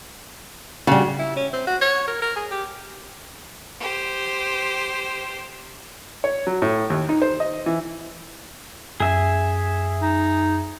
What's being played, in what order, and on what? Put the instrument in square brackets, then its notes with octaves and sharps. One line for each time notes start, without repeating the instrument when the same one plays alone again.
[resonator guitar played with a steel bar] C#3 [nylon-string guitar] G3 F#4
[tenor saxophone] E4
C#4
C4
F#4
C#5
A#4
A#4
G#4
G4
[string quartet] G4 C5
[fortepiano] C#5
F#3
A2
D#2
D#4
C5
D#5
E3
[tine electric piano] F#2 [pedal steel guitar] G#4 E5 G#5
[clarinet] D#4